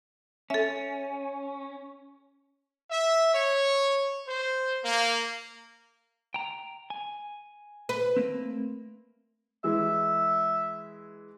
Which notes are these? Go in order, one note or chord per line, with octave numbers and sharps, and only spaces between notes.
C#4 A4 E5
E5
C#5
C5
A#3
G5 A#5
G#5
B4
A3 A#3 C4
E3 G#3 E5